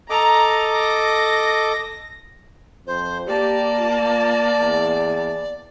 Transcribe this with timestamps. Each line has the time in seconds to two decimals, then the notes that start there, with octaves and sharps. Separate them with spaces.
0.10 A4 D#5 A#5 D6
0.73 A#6
2.87 F2 C5
3.27 A#3 G4 D5 A5
3.79 F4
4.61 E2